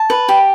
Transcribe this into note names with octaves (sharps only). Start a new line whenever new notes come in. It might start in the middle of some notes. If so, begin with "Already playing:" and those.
Already playing: A5
B4
G4